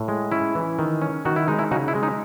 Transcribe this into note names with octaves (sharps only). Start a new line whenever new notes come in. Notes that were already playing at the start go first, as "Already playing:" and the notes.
Already playing: A2
G#3
C#4 E4
E3
D#3
C#4
D#3 F#4
E4
G#3 D#4
E4
C#3 D#4 F#4
E4
G#3
D#4